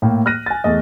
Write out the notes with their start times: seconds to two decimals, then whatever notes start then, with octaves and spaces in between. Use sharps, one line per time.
0.02 A2 A#3 G5
0.26 F6 F#6 A#6 D#7
0.46 G#5 A6
0.64 E2 A3 D#5